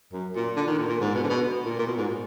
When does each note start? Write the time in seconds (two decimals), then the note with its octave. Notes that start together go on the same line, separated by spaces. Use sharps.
0.13 F#2
0.35 A#2
0.56 D3
0.67 D#3
0.78 A#2
0.89 A#2
1.00 G#2
1.15 B2
1.24 D3
1.30 B2
1.65 A#2
1.79 A#2
1.87 B2
1.98 G#2
2.08 A#2